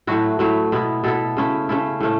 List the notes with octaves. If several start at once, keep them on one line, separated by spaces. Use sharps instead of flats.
A2 F#3 A3 E4 F#4
A2 F#3 A3 E4
B2 B3 E4
B2 B3 E4 A4
C#3 A3 C#4 E4
C#3 A3 C#4 E4
A2 A3 C#4